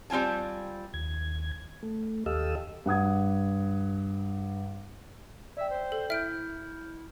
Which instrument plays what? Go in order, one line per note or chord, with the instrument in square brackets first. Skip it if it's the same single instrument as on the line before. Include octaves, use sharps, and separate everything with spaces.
[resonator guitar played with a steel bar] G3 C4 F4 G#5 A5
[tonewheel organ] D#2 G#6
A3
D#2 G4 A4 D#5 F5 E6
[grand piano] G2 F#5 D#6 G#6
[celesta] D5 G5 [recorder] E5
[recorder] C5
[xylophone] A4
[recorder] E4 [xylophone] E5 D7 [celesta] F6 G6